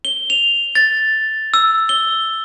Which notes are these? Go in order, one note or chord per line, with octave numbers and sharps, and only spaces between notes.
G7
F7
A6
E6
G7